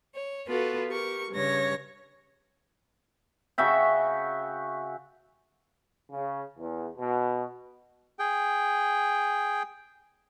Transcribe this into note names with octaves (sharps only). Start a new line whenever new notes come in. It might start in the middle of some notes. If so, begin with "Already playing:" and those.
C#5
B3 F4 F#4 A4 B4
G4 A#4 C#6
G2 C#3 C#5 A#6
C#3 F#4 E5 G5
C#3
E2
B2
G#4 G5